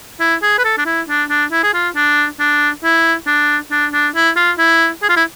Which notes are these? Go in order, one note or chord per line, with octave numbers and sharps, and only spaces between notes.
E4
G#4
B4
A4
D4
E4
D4
D4
E4
G#4
F4
D4
D4
E4
D4
D4
D4
E4
F4
E4
G#4
F4
E4